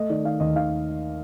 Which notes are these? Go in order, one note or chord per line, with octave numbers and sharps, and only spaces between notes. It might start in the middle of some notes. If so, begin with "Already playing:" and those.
Already playing: A3 D#5
D#3 D5
D#3 F5
D#2 D#5
D#3 F5